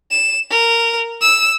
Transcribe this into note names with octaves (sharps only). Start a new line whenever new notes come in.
E7
A#4
E6